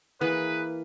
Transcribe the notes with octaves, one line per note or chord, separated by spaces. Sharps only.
E3 A#3 G#4 B4